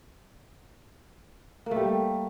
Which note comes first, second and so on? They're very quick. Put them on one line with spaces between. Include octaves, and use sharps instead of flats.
A#3 A3 G3